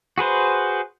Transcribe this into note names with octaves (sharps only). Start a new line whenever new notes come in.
F#4 G#4 B4 C5